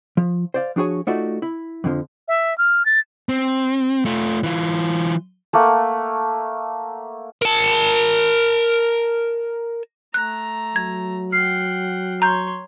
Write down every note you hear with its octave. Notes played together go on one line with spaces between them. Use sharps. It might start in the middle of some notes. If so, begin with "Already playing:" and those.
F3
C5 D5 F5
F3 D4 F#4 G#4 C#5
A3 D#4 F4 F#4 D5 E5
E4
F2 D3 F3
E5
F6
A6
C4
A3 F4
E3 F4
A3 A#3 F#5 A5
A#4 A5
A3 A#5 F#6
F#3 G#6
F#5 G5 F6 C7
C#5 A#5 C6 G6